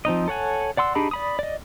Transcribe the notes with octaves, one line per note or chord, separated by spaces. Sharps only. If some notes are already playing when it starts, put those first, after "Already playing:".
F3 C4 D#4 D#5
A4 C#5 F#5 G#5
D5 F#5 C6 E6
D4 D#4 G4 G#4 B5
D5 B5 D#6
D5 D#5